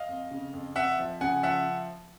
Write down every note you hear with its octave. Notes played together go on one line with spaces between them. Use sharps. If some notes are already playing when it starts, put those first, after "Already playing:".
Already playing: D#5 F5
F2
C#3
F2
F2 E5 F#5
F3
C#3 F#5 G#5
F3 E5 F#5